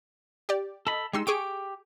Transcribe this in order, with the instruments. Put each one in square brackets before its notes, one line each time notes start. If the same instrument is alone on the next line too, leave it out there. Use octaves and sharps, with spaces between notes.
[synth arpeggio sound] G4 D5
[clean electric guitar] A4 B5 [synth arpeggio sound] D#5
[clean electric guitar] G#3 D#4 [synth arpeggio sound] G4 C6 E6
[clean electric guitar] G4 [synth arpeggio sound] G#4 C#6 D7